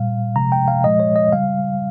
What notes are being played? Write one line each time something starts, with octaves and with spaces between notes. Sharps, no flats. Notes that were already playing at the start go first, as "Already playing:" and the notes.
Already playing: A#2 G3 F5
C3 F3 G#3 A#5
G5
F5
A#2 F3 G#3 D#5
C#5
D#5
C#3 G3 F5